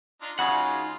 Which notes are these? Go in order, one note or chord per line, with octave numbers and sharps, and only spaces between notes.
D4 D#4 F4
C#3 G#3 D#4 F4 F#4 F#5